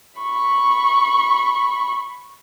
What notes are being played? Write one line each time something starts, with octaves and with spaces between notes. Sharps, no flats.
B5 C#6